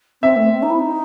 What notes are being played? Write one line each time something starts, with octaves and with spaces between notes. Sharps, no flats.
C4 E5
A3
C4
D#4
E4
D#4